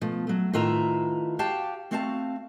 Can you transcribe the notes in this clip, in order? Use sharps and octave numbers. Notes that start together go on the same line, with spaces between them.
B2 F3 A3
F#3 A3
A2 D#3 F4 B4 E5 A#5
F#4 G4 F5 G5 A5
A3 C4 F#4 F5 G#5 A5